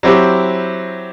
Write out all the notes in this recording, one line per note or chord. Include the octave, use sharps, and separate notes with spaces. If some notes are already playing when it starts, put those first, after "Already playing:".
F#3 C4 E4 G4